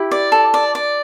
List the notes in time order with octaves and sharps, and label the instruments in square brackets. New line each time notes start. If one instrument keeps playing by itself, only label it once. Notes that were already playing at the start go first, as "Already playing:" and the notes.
Already playing: [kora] E4 G4
[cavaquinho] D5
A4
D5
D5